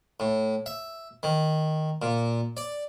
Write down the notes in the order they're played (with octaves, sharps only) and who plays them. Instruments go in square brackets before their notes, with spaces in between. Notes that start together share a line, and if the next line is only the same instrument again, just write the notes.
[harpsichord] A2
E5
D#3
A#2
D5